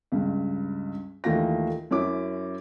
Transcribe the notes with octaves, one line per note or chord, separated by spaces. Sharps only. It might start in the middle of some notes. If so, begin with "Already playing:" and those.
C#2 G2
D#2 E3 A3 F4 A#6
F#2 C#4 E4 D6